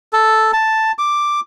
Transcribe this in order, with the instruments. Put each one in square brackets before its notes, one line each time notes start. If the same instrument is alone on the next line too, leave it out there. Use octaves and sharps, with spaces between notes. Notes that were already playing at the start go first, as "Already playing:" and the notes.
[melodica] A4
A5
D6